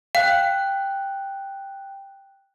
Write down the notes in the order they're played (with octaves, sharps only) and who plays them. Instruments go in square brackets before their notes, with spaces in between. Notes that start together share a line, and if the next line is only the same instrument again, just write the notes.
[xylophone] F5 [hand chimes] G5 F#6